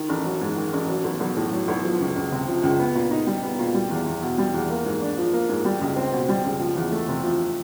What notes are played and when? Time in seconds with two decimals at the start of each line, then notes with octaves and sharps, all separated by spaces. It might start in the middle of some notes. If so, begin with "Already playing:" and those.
Already playing: D#3
0.09 A1
0.25 F#3
0.41 G#2
0.57 D#3
0.73 A1
0.89 F#3
1.04 B1
1.20 B1
1.36 A2
1.53 F#3
1.68 B1
1.84 F3
2.00 C#2
2.16 C#2
2.32 C3
2.48 F3
2.63 C#2
2.79 B3
2.95 A#2
3.11 D#4
3.27 G3
3.43 B3
3.59 A#2
3.74 G3
3.90 E2
4.06 E2
4.22 B2
4.38 G3
4.54 E2
4.70 A#3
4.86 G#2
5.01 D4
5.18 F3
5.33 A#3
5.49 G#2
5.65 G3
5.81 C#2
5.96 C4
6.12 B2
6.29 G3
6.45 C#2
6.60 F3
6.76 E2
6.92 A3
7.08 C3
7.23 F3